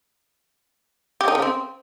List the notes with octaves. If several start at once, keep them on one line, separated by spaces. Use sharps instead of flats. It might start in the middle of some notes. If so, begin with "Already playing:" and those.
G4
D#4
C#3
C4